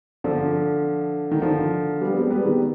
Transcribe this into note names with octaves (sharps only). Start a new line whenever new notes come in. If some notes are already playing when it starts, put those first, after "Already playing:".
D3 F3
D#3
D3 F3
G3 B3
G#3 C4
G3 B3
D#3 G3